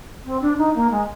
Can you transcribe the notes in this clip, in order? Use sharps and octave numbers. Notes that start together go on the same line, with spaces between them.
C4
D4
D#4
A#3
G#3